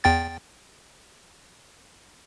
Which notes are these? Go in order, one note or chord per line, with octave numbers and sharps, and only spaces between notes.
E2 G5 A6